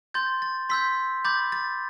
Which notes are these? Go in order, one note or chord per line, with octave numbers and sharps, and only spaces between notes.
C6 G6 A6
A6
C6 E6 G6 B6
B5 D6 G6 A6
A6